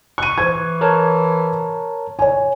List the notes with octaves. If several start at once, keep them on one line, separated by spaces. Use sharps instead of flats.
C#6 F#6 D#7
E3 C5 G#6
A#4 C#5 A5
C#5 G#5